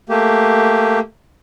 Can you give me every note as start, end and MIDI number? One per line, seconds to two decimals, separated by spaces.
0.09 0.99 57
0.09 0.99 58
0.09 0.99 67